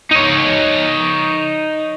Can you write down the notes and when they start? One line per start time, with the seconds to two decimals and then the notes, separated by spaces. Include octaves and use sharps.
0.11 D#4 C#5